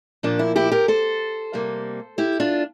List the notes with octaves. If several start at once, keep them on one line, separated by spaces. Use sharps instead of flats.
A#2 F3 A#3 D4
E4
E4 G4
G4 A#4
A4 C5
C3 G3 A#3
E4 G4
D4 F4